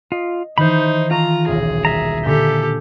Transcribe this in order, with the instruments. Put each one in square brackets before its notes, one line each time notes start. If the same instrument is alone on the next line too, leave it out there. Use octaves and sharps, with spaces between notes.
[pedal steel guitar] F4 [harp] D#5
[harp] D#3 E3 [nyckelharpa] D#4 [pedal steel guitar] C5 B5
[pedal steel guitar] F4 [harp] G#4 A4 C#6 [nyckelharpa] A#5
[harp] D#1 B1 A#6 [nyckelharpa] G#4
[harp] G3 [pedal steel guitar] E5 A#5
[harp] A#2 D3 G#5 [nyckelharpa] G4 A4